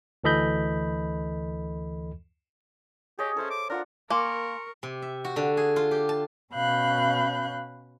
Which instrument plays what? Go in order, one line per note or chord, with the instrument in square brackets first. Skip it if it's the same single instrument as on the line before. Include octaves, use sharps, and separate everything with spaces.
[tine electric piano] D2 E3 A4 D#5 B5 G6
[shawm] G4 [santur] G#4 C#5 D#5
[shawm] C#4 [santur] A4 C5 E5
[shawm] D6
[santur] D4 F4 F#5 [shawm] A#4
[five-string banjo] A#3 [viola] A#4 C#6 [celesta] G#5 C6
[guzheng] C3
E5
F#4
D3
G#4
F4
G4
A5
[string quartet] B2 C#4 F5 B5 F#6 G6